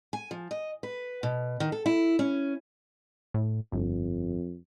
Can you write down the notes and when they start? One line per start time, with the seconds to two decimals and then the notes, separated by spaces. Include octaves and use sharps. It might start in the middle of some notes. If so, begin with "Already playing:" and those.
0.13 G#5
0.31 F3
0.51 D#5
0.83 B4
1.23 B2
1.60 D#3
1.72 A4
1.86 E4
2.19 C#4
3.34 A2
3.72 G1 F2